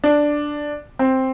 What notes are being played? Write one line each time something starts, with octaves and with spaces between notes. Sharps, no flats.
D4
C4